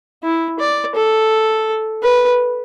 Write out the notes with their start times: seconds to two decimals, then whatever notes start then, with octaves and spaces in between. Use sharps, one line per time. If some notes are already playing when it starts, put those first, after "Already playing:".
0.23 E4
0.60 D5
0.96 A4
2.03 B4